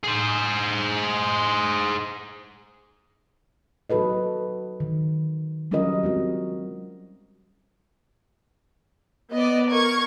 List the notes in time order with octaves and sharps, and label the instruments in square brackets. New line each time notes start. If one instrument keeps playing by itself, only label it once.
[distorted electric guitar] G#4 C5
[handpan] F#3 D#4 F#4 A4 B4 D#5
D#3
F#3 G3 C#4 F4 A#4 D#5
G#3 C4 F#4
[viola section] B3 [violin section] D5 D#5
[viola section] A#4 [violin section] C#6 G#6